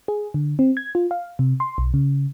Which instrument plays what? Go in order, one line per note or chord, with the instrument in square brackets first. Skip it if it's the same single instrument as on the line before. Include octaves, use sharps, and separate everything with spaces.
[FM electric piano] G#4
D3
C4
G#6
F4
F5
C3
C6
B1
C#3